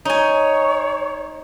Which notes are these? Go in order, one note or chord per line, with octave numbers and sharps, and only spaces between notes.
D#4 C#5 G#5